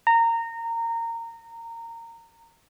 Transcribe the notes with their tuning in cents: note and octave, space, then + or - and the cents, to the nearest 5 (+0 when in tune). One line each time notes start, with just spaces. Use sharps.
A#5 -20